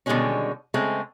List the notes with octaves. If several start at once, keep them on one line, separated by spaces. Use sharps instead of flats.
B2 D3 D#3 G3 G#3 C#4
C#3 G#3 A3 C4